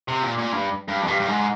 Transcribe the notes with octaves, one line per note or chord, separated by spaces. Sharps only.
C3
A#2
A#2
G2
G2
F2
G2
G2
G#2